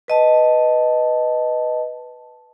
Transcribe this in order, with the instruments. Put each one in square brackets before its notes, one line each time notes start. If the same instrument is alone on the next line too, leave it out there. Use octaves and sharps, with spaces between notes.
[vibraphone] B4 D#5 A5